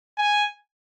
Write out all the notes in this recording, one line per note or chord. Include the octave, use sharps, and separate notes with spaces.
G#5